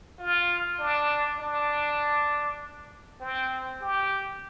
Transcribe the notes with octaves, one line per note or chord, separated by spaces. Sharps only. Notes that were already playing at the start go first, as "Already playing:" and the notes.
F4
D4
D4
C4
G4